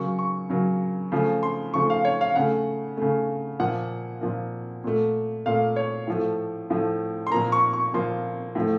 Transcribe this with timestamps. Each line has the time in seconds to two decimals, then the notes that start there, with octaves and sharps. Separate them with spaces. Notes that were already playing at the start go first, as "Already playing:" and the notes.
Already playing: C#3 F#3 A#3 C#6
0.19 C#6
0.50 C#3 F#3 A#3
1.12 C#3 F3 A3
1.43 C6
1.74 C#3 F3 A3 C#6
1.90 F5
2.05 C#5
2.21 F5
2.36 C#3 A3 F#5
2.97 C#3 A3
3.59 A#2 F3 A#3 F#5
4.21 A#2 F3 A#3
4.84 A#2 A3
5.46 A#2 A3 F5
5.76 C#5
6.07 A2 F3 A3
6.70 A2 F3 A3
7.27 C6
7.31 A#2 F3 A#3 A#5
7.52 C#6
7.73 C#6
7.94 A#2 F3 A#3 C6
8.55 A2 F3 A3